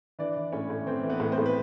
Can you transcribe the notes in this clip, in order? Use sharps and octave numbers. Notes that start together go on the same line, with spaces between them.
E3 D4 D5
E3
A2 C#4 C#5
A2
E3 C4 C5
E3
B3 B4
A2
C4 C5
A2
B4